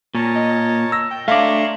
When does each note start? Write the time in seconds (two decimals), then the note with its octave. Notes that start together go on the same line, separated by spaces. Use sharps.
0.15 A#2 A#4 C#5 A5
0.36 D#5
0.92 E6 A#6
1.11 G5
1.28 A3 D4 C#5 E5 F5 A#5 C6 D6